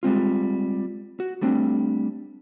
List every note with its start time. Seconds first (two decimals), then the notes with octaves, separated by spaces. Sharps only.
0.03 G3 G#3 C4 F4
1.20 F#4
1.41 G3 A3 C4 D4